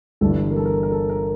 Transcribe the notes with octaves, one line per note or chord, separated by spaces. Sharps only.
G1 G2 E3 A4
A#4
A4
A#4
A#4
A4
A#4